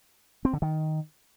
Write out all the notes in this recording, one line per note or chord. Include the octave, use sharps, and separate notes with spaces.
C4
D3
D#3